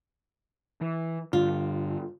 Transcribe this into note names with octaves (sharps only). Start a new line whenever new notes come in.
E3
G2 D3 F4